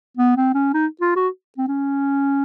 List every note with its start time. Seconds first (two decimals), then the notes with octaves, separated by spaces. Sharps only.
0.17 B3
0.37 C4
0.54 C#4
0.74 D#4
1.01 F4
1.16 F#4
1.58 C4
1.68 C#4